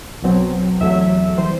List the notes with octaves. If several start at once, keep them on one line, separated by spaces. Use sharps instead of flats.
B1 B2 F#3 C4
E2 C3 F#3 A3 E5
C3 E3 G3 C5